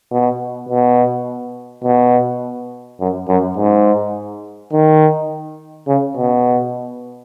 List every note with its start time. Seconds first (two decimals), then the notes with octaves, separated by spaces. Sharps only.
0.12 B2
0.69 B2
1.84 B2
3.00 F#2
3.28 F#2
3.57 G#2
4.73 D#3
5.88 C#3
6.17 B2